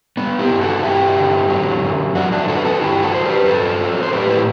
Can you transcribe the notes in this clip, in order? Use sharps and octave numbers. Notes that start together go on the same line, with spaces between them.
G3 B3
E4 G4
G2
F#4 A4
G2 E4 G4
D3
F#3
F#2
F#2 D4 F#4
D4 F#4
D3 F#4 A4
B4
F#4 A4
G2 E4 G4
F#4 A4
F#3 C5
G4 B4
G2 A4 C5
F#3
C5
A2 G4 B4
E4 G4